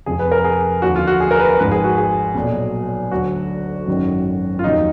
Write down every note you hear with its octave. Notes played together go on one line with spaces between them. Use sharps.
F1 F2 F3 G#4
B4
A#4
G#4
D#2 D3 F3 F#4
F4
F#4
G#4
A#4
B4
A#4
G#1 G#2 F3 B4
G#4
F#4
G#4
B1 A#2 F#3
D2 D3 F#3 F#4
G#1 F#2 D#3 F#3
F4
F1 D#2 D#3 F#3 D#4